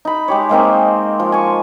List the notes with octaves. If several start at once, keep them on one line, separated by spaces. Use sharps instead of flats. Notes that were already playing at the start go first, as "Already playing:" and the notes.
D#4 B5
G#3 G4 C#5
G#3 A#3 C4 D#4
F3
G#5 C#6